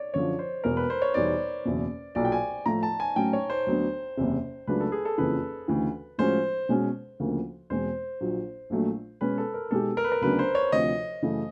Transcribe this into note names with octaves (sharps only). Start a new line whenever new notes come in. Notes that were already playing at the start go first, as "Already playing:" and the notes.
Already playing: C#5 D5
F#2 D3 F3 C#5
C5
E1 E2 B2 A#4
B4
C5
C#5
E2 B2 G3 B3 D#4 D5
F#1 E2 B2
B1 A#2 F#3 D5
G5
G#5
A2 F3 A3 A#5
A5
G#5
A2 F#3 A3 C#4 G5
C#5
C5
D2 D3 F#3 B3 D4
F#1 E2 C3
C#2 C#3 F#3 A3 D4 B4
A4
G#4
A4
F#1 F2 C#3 E3 B4
D2 C#3 E3
A2 F3 G#3 C#4 F#4 C5
B2 G#3 C#4 F#4
D2 C#3 F3 A#3
E2 B2 G#3 C4 C5
A#1 A#2 F#3
A#1 A#2 F#3 A3
B2 G#3 C#4 B4
A4
A#4
B2 G#3 B3 D#4 G4 A4
A#4
B4
A#4
D2 C#3 F#3 B3 D4 B4
C5
C#5
D2 C3 F3 D#5
F#2 C#3 E3 A3